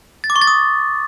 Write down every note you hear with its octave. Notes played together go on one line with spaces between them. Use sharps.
A6
D6
C#6
A6
D#6